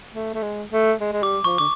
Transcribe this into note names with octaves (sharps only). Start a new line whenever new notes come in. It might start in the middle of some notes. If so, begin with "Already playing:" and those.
A3
A3
G#3
A3
G#3
G#3
G3 D6
F3 C#6
D3 D6